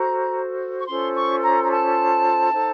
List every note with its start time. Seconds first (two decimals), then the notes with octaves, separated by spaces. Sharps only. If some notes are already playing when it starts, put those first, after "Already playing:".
Already playing: F#4 A4 C5 A#5
0.78 C#6
0.88 C#4 F4 A4 C5 C6
1.16 C#6
1.43 A#5
1.64 A#5
1.71 A5
2.52 D#4 A4 C5